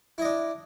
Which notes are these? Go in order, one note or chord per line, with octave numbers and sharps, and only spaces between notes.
D4 E4 D#5